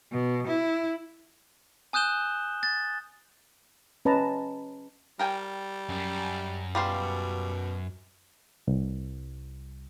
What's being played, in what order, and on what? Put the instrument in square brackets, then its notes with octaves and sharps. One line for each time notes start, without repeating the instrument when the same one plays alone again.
[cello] B2
E4
[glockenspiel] G#5 D#6 F#6 G6 E7 G7
A6
[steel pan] C#4 B4 D#5 A5 A#5
[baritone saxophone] G3 [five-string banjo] A#4 G5 G#5
[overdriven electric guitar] F#2
[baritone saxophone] B2 [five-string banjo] G3 F4 C5
[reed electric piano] C2